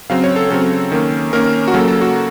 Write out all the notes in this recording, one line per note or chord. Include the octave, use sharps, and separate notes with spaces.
C#3 F#3 C4 F5
C#5
A4
C#3 F#3 C4 A4
D#3 A#3 C#4
D#3 A#3 C#4 A#4
F#4
C#3 F#3 A#3 A4
A4
F#4